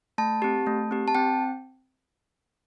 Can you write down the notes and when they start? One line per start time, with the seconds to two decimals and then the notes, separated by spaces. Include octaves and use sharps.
0.18 A3 A5
0.42 C4 G4
0.67 A3
0.91 C4 G4
1.08 A5
1.15 C4 G5